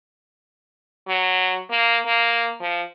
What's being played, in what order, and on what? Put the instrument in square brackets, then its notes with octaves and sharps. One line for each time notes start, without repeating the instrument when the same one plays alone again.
[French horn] F#3
A#3
A#3
F3